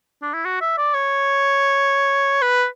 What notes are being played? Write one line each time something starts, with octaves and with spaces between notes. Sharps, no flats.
D4
E4
F#4
E5
D5
C#5
B4